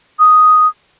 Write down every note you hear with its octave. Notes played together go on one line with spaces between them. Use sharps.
D#6